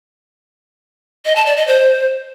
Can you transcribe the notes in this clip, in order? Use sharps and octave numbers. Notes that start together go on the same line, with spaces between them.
D#5
A5
D5
D#5
C5